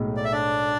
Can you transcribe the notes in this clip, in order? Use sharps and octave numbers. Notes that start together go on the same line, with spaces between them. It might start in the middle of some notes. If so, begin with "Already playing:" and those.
Already playing: B1 A2 G#3
D5
E5
D4 D5